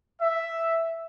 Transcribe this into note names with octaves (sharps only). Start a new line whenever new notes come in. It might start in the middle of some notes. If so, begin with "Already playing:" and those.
E5